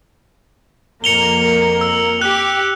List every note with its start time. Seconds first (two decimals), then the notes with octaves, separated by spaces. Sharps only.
1.04 F2 A#3 A#4 C#7 F7 G7
1.81 E6
2.21 G4 F#6